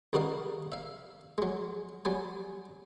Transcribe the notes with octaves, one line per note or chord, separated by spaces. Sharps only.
C#2 G3 F#4 A#4 D#5 F5
E5 F5
F#3 G#3
F#3 G3 G#5